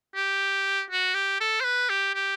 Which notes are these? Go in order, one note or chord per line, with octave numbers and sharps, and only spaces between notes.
G4
F#4
G4
A4
C5
B4
G4
G4